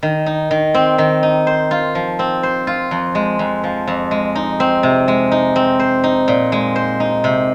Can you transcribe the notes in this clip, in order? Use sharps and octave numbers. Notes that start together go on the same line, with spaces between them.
D#3
D#4
D#3
C4
D#3
D#4
C5
F4
F3
C4
C5
F4
F2
G#3
F2
F3
F2
G#3
D#4
C4
C3
G#3
D#4
C4
C5
D#4
A#2
G#3
C5
D#4
C3